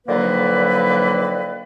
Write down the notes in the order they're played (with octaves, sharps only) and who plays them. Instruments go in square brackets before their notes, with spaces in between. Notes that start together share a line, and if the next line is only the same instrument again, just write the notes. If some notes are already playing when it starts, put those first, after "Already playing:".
[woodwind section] D3 D#3 F3 F#3 A#3 B4